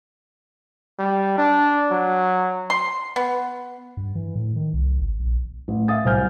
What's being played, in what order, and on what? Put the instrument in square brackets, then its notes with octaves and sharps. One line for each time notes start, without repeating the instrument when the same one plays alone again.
[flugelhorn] G3
D4
F#3
[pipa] C6
B3
[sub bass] G2
E3
A2
D#3
C2
G#1
A#1
[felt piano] A1
E5 F5 D#6 A6
C2 F#3 C5 G#5 F6 G6